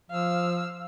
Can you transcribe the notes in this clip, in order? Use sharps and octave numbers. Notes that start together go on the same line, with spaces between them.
F3 F5 E6